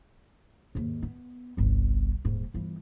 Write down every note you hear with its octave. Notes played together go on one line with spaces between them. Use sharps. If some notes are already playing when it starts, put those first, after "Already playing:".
D#2 G#2
B3
G1 C2
D#1 G#2
G1 E3